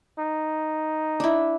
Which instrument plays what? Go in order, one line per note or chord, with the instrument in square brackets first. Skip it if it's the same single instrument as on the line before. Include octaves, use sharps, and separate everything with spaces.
[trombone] D#4
[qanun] D4 E4